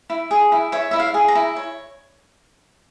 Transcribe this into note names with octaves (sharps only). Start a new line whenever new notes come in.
E4
G#4
E4
C#5 E5
E4 E5
F5
G#4
A#5
E4
C#5